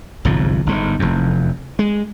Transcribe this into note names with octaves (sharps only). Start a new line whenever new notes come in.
G1 C2 G#2 F3
G1 G#2
F1 E2
G#3